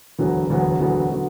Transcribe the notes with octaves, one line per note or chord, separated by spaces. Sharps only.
E1 D2 D3 F#3 B3
E1 D2 D3 F#3 B3
E1 D2 D3 F#3 B3
D3 F#3 B3